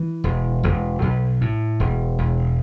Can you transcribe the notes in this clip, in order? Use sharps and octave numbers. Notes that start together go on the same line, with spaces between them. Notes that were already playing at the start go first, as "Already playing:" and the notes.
Already playing: E3
E1
E1
B1
A2
E1
E1